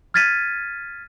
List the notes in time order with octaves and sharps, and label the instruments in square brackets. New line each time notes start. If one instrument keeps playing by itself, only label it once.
[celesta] F6 G#6 A6 B6 D#7